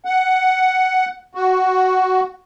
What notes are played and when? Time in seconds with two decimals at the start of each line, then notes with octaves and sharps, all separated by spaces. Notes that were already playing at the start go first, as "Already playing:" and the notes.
0.05 F#5
1.35 F#4